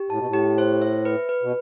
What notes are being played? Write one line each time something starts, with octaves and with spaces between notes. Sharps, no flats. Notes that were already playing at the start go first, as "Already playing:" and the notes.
Already playing: G4
A2 A5
B2
A2
G4
C5
E5
B4
B4
B2